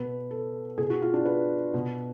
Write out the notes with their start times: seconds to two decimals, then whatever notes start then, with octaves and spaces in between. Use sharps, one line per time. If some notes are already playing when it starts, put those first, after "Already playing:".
Already playing: B2 B4
0.31 A4
0.78 B2 G#4
0.90 F#4
1.02 F4
1.14 D4
1.25 B4
1.74 B2